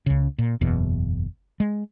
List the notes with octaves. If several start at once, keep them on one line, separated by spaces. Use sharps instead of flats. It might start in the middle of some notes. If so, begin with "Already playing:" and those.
C#2 C#3
A#2
F#1 E2 B2
G#3